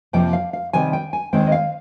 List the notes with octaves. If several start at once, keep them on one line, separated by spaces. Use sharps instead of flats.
F2 C3 F3 A#3 G5
F5
F5
C3 D#3 G3 C4 G#5
G5
G#5
D#2 D#3 G#3 C4 G5
D#5
F5